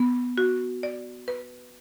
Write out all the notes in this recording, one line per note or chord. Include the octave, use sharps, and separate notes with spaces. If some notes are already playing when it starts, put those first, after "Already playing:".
Already playing: B3
F#4
D5
B4